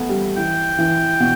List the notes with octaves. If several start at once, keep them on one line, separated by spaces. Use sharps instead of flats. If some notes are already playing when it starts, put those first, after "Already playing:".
Already playing: A3 B3
G3
E3 G5
E3
B2